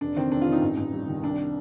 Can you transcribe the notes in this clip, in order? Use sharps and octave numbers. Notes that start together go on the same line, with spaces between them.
F1 D4
D#3 C4
F1 D4
F4
D#3
D#4
A1
A1
G2
D#3
C2 D4